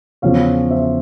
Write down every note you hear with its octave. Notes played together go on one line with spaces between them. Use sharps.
E2 C#3 F3 C#5 F5
C5 E5